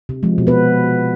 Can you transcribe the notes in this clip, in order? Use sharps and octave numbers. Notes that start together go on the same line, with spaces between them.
C3
F3 G#3
B2
B3 B4